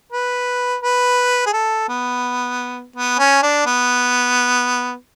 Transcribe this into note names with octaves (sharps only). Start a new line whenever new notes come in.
B4
B4
G#4
A4
B3
B3
C#4
D4
B3